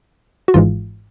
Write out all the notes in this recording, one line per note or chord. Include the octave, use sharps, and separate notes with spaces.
F#4
G#1 G#2 E3 G#3 F4